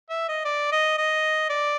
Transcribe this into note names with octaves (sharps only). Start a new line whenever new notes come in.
E5
D#5
D5
D#5
D#5
D5